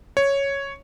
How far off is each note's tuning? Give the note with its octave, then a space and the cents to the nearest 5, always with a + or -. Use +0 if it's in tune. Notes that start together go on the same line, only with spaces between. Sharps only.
C#5 +0